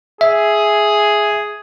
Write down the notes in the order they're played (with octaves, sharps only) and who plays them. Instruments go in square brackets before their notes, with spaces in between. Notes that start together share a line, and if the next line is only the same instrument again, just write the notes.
[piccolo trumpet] G#4 [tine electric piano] E5